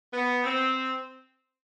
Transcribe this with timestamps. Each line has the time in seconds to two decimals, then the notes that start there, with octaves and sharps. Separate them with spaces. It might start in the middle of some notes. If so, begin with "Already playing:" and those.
0.14 B3
0.44 C4